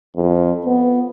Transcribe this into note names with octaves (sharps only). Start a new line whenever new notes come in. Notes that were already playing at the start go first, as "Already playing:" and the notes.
F2
B3